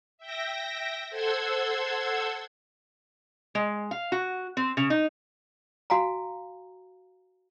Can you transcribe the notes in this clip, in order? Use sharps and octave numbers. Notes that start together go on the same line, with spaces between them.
E5 G5 A#6
A4 C5 F#5 C6 E6 G#6
G#3
F5
F#4
C4
C#3
D#4
F#4 F5 G#5 A#5